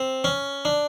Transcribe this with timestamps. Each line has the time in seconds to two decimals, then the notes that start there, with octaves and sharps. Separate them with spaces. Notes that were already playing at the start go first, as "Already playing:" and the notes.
Already playing: C4
0.24 C#4
0.65 D4